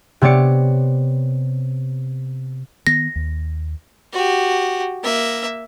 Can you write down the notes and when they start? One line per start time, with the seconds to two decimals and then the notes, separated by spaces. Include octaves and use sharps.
0.21 C3 B3 C#5 D5 C#7
2.87 D#3 B3 A#6
3.16 D#2
4.13 F#4 G4
5.03 A#3 E5